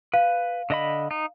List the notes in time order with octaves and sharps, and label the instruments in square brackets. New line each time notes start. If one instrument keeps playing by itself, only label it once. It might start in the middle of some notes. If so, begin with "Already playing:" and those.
[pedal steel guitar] B4 [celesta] F5
[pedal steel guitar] D3 D#5 B5
D#4